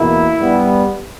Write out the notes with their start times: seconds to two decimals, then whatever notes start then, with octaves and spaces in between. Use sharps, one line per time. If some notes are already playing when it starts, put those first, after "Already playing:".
Already playing: E2 B2 A#3 E4
0.39 G2 G3 B3